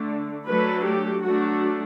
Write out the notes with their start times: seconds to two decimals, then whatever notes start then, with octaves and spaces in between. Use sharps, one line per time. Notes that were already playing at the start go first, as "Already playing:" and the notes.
Already playing: D3 A3 D4
0.47 F#3 A3 D4 B4
0.85 G4
1.24 F#3 A3 D4 F#4